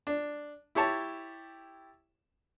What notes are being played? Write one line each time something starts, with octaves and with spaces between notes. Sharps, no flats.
D4
E4 G4 C#5 A5